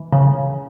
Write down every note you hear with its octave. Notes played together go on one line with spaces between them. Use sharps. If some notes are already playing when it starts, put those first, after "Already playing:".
Already playing: E3
C#3